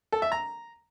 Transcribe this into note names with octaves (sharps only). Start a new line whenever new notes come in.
A4
E5
A#5